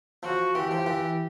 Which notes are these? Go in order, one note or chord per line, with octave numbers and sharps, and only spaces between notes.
F3 F#4
E3 G4
F3
E3